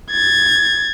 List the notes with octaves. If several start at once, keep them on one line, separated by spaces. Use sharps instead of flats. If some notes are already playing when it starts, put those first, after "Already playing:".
G#6 A6